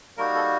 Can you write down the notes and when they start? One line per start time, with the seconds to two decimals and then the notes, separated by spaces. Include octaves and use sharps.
0.17 G3 A#3 D#4 F#4 A#4
0.35 A4